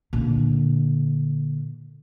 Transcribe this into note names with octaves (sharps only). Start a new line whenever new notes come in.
A#2 D3